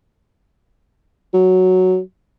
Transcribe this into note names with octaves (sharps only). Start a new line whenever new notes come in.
F#3